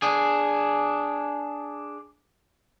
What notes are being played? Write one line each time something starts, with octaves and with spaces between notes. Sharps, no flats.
D4 G#4